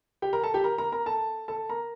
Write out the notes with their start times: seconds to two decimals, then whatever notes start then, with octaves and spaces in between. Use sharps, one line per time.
0.22 G4 G5
0.33 A#4 A#5
0.44 A4 A5
0.54 G4 G5
0.64 A#4 A#5
0.78 A#4 A#5
0.92 A#4 A#5
1.06 A4 A5
1.48 A4 A5
1.69 A#4 A#5